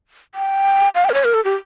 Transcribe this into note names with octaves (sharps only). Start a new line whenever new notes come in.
G5
F5
G5
A#4
C#5
A#4
A4
G4